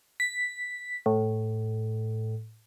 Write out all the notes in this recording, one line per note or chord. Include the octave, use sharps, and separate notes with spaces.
B6
A2